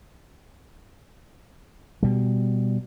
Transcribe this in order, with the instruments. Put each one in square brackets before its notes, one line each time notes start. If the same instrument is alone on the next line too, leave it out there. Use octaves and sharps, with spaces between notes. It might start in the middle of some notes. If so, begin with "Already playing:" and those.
[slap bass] B2 G3